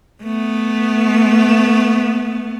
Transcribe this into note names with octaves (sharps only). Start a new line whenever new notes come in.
A3 B3